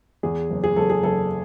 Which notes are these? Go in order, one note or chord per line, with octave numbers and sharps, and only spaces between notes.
E2 G#4
F#1
G#4
F#1 A4
G#4
F#1 A4